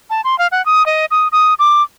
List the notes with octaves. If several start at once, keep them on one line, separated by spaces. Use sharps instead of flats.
A5
C6
F5
F#5
D#6
D#5
D#6
D#6
D6